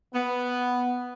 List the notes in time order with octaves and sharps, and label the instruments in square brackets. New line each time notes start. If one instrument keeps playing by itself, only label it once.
[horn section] B3